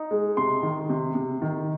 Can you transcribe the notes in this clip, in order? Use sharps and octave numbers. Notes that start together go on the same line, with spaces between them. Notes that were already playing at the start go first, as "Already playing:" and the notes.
Already playing: D#4
G#3
C3 C6
D#3
C3
C3
D#3